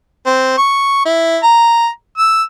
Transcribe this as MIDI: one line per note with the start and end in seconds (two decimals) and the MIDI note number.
0.26 0.55 60
0.58 1.01 85
1.05 1.38 64
1.43 1.88 82
2.17 2.43 88